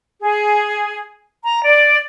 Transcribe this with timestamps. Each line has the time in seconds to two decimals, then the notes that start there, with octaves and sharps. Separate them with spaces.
0.22 G#4
1.44 A#5
1.64 D5